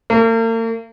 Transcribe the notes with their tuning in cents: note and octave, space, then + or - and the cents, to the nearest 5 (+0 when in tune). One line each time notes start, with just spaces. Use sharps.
A#3 -45